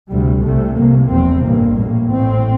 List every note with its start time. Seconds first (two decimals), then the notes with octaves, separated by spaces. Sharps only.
0.09 D2 C3 G3
0.42 C2 C3 A3
0.76 C2 C3 A#3
1.10 F1 E2 C3 C4
1.43 A1 G2 A#3
1.76 A#1 A2
2.10 A1 A2 C4